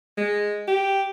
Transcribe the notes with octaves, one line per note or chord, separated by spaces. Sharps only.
G#3
G4